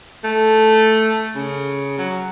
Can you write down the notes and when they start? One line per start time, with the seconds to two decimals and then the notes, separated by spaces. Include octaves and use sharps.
0.24 A3
1.35 C#3
1.98 F#3